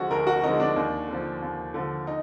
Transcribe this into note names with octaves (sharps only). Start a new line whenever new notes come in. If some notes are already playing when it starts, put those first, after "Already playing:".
Already playing: D2 D3 F3 G#3 F#4
D2 A#4
F#4
D3 F3 G#3 D#4
D4
D#2
D3 F3
D#2
D3 F3
D#4